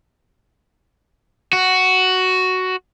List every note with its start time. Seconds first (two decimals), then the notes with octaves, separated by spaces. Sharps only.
1.53 F#4